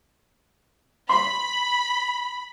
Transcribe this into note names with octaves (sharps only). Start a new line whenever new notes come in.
B5 C6